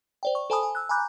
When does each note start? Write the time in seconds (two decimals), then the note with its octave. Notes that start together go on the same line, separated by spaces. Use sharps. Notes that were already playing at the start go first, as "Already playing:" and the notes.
0.23 C5 D5 G5
0.35 C#6
0.50 A4 C5 G#5 A5 B5 D#6
0.63 G#5
0.75 E6 F#6
0.89 G#5 A#5 B5 D6 F#6 G6